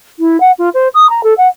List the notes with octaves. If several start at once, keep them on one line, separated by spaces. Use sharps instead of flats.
E4
F#5
F4
C5
D#6
A#5
A4
F#5